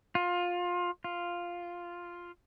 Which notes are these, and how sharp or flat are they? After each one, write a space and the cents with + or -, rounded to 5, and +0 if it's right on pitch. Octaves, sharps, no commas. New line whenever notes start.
F4 +20
F4 +0